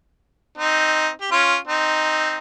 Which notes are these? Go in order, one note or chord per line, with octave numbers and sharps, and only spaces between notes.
C4 D#4
G4
C#4 F4
C4 D#4